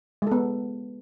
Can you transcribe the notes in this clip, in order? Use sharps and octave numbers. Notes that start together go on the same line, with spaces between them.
G#3 B3 A4